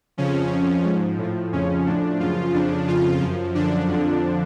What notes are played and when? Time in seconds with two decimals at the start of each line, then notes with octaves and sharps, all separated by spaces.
0.17 F2 C#3 F3 C#4
0.51 F2 F3
0.85 G#2 F3
1.18 A2 F3
1.53 F2 C#3 F3 C#4
1.86 A2 F3 D4
2.20 F#2 C#3 F3 F4
2.54 F2 C#3 F3 D4
2.87 F2 C#3 F3 F4
3.21 F#2 F3
3.55 F#2 D3 F3 D4
3.88 F2 D3 F3